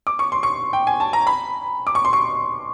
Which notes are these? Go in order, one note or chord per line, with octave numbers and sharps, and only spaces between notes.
D6
C#6
C6
C#6
G5
G#5
A5
A#5
B5
D6
C#6
C6
C#6